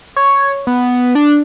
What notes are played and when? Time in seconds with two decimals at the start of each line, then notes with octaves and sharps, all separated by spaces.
0.16 C#5
0.67 B3
1.15 D4